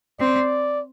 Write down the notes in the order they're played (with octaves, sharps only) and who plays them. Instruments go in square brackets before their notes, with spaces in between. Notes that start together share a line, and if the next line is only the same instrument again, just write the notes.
[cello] C4 [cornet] D5